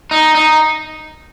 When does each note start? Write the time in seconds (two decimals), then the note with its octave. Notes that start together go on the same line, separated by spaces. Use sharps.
0.11 D#4
0.35 D#4